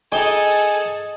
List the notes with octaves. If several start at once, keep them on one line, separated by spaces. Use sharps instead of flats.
D#4 G#4 A4 D#5 G5 G#5